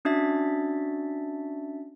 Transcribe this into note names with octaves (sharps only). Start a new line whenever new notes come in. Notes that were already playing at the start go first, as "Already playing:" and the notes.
C#4 D4 F#4 E5 A6